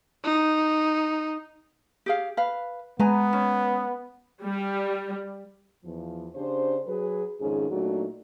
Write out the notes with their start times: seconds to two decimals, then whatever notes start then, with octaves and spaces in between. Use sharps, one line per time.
0.24 D#4
2.06 G4 G#4 F5
2.37 B4 F5
2.99 G#3 B3 B4 G#5 A#5
3.33 C#4
4.43 G3
5.84 E2 F3
6.35 C#3 D4 G4 C5
6.87 F#3 G#4 B4
7.41 F2 G#2 D#3 C#4 G#4
7.70 A#2 F#3 A3 D4 D#4 F#4